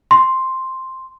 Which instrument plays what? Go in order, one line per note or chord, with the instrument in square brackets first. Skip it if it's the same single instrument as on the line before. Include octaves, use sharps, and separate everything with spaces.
[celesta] C6